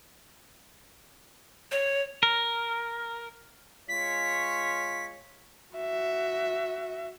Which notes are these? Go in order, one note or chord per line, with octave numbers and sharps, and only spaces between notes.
C#5
A#4
G#3 F4 C#5 B6
F#4 E5